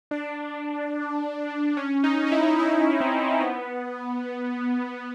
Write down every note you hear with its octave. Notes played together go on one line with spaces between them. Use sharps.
D4
C#4
D#4
D#4
E4
E4
C4
B3